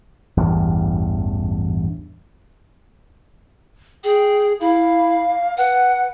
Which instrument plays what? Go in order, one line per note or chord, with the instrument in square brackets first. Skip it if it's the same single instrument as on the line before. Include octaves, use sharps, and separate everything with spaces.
[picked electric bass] A1 E2 G2
[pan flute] G#4 [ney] G5
[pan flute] E4 [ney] F5
[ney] B4 [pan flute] F#5